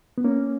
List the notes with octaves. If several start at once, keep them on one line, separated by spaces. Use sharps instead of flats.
B3
A#3 C#4